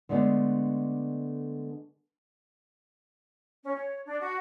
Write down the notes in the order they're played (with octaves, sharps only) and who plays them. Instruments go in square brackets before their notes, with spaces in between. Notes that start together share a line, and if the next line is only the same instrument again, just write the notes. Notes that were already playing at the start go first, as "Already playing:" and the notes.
[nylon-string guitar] D3 G#3 A3 B3 D4
[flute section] C#4
C#5
D4
F#4